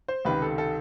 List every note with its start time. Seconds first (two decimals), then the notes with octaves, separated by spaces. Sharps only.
0.08 C5
0.25 C#2 C3 D#3 B4
0.42 A4
0.58 A4